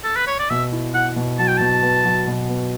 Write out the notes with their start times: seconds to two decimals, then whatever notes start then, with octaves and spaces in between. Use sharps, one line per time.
0.04 A4
0.16 B4
0.27 C#5
0.39 D5
0.50 B2 E5
0.72 E4
0.94 E4 F#5
1.16 B2
1.39 F#3 A5
1.48 G5
1.57 B2 A5
1.83 B3
2.05 F#3
2.28 B2
2.49 B3